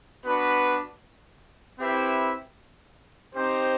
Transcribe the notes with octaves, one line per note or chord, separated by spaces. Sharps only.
B3 D4 F#4 B4
C4 E4 G4 B4 E5
C4 D#4 G4 C5